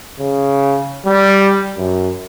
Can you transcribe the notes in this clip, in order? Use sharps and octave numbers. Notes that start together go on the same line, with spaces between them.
C#3
G3
F#2